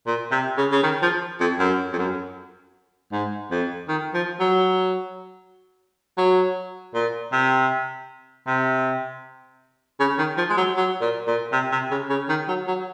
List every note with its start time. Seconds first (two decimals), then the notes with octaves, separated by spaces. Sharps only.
0.07 A#2
0.32 C3
0.57 C#3
0.72 C#3
0.83 D#3
1.02 F3
1.40 F2
1.59 F#2
1.93 F2
1.98 F#2
3.12 G#2
3.51 F2
3.89 D#3
4.14 F3
4.40 F#3
6.18 F#3
6.94 A#2
7.32 C3
8.47 C3
10.00 C#3
10.18 D#3
10.37 F3
10.50 G#3
10.57 F#3
10.77 F#3
11.01 A#2
11.27 A#2
11.53 C3
11.72 C3
11.91 C#3
12.10 C#3
12.29 D#3
12.48 F#3
12.67 F#3